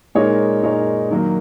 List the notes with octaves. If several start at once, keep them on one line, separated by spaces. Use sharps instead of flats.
A#2 G#3 D#4 A#4 C#5
A#2 G#3 D#4 A#4 C#5
D#3 F#3 A#3